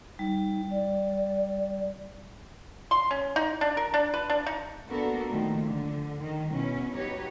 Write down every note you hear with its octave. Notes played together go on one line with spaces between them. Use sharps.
G3 D#4
D5
C6
C#4
D#4
D4
A#4
D4
B4
D4
D#4
A#3 B3 D4 F#4 A4 A#4
A#2 D#3 F3 A3
D3
D#3
B2 B3 C#4 E4
D#4 F#4 G4 B4 C#5